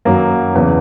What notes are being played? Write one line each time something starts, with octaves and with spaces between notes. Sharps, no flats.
F#2 D#3 F#3 A#3
E2 C#3 E3